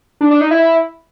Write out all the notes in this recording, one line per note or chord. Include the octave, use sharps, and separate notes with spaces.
D4
D4
D#4
E4